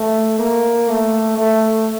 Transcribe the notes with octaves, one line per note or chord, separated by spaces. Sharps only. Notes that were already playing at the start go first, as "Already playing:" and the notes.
Already playing: A3
A#3
A3
A3